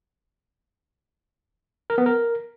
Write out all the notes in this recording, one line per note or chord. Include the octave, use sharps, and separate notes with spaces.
A#4
B3
A#4